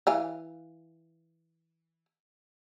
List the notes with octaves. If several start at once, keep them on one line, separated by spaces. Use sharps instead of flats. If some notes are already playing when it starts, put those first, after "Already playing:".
E3 F5 G#5